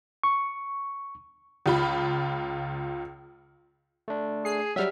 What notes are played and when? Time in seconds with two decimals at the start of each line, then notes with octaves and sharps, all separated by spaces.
0.24 C#6
1.66 C#2 F4 B5
4.08 A3 D4
4.45 G#4 C7
4.76 F#3 G3 E5 F6